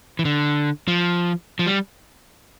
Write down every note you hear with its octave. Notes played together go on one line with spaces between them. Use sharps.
E3
D3
F3
F3
G3